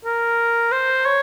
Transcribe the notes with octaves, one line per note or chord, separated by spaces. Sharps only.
A#4
C5
C#5